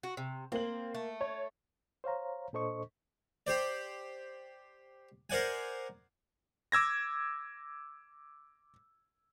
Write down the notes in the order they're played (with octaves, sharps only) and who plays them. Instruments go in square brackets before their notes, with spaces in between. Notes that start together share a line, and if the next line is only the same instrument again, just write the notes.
[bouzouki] F#4
C3
[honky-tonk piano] A#3 F#7 [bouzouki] C4
[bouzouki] A3
[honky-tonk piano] C#5
[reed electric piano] C5 C#5 F5 A#5
A#2 D4 A4 C5 D#5 C#6
[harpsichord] G4 C5 D5
A#4 C5 D5 F#5 G#5
[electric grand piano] D6 E6 G#6 A#6